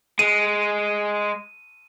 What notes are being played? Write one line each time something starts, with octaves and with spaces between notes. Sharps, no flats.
G#3 D#7